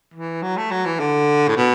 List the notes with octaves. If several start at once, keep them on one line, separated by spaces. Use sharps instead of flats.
E3
F#3
A3
F#3
E3
D3
A2
B2